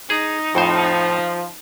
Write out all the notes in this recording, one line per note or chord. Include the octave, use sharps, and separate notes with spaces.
D#4 G#4
F2 A2 F3 C5